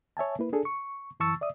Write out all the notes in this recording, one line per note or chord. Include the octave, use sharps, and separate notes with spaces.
C#5 E5 G#5 A5
A#3 E4 B4
D4 G#4 A4
C#6
F#2 E3 A5 C#6 E6 A6
D5 E5 D#6